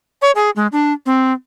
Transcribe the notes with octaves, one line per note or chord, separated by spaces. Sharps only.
C#5
G#4
G#3
D4
C4